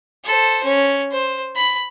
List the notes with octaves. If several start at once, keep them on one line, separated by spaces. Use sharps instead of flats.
A4 C5
C#4
C5
B5